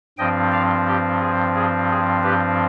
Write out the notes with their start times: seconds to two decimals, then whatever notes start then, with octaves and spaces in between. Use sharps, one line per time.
0.18 G2 F3 C4 D#5 G5
0.52 D5 F5
0.87 G4
1.21 G#4
1.55 G#4
1.90 G#4
2.23 G4 B4